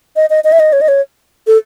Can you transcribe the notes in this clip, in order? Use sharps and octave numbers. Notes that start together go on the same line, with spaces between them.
D#5
D#5
D#5
E5
D#5
C#5
D#5
C#5
A4